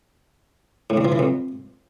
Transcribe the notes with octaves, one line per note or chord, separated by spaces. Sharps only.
A2
E2
F3
E3
F2